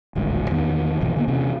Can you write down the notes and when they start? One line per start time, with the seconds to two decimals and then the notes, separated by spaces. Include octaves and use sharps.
0.15 D#1 A1 D2 G#3
0.50 E2 D#3 B3
1.01 G#1 B2 E3 F3
1.16 D3 A#3 B3
1.28 C3 E3 C4 C#4